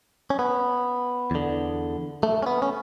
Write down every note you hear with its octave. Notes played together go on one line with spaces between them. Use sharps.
C#4
B3
E2 D3
A3
C#4
B3
C#4